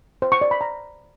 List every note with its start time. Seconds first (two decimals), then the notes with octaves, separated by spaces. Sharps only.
0.22 C5
0.32 C#6
0.41 D5
0.51 B5
0.61 A#5